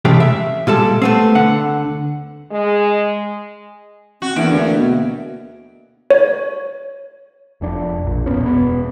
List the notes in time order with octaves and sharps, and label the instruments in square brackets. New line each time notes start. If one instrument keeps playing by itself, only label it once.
[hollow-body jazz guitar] C3 E3 G#3 A3 C#4 G4
E5
A#2 G3 G#3 A4
A3 B3 C4
D2 D3 F#5
[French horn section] G#3
[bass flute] C4 [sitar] F#4
[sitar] E2 [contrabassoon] E3 [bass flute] A#3 [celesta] D4 E5 D7
[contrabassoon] D2
B2
[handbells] C#5
[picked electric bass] F1 F2 D4
A#1 A#2
E1 F#2 B3 C#4
E1 B3